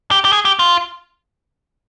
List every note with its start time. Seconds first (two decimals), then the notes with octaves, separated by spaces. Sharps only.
0.11 G4
0.25 G4
0.33 G#4
0.45 G4
0.59 F4